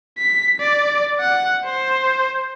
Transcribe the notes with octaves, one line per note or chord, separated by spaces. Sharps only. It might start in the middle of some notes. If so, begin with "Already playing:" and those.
B6
D5
F#5
C5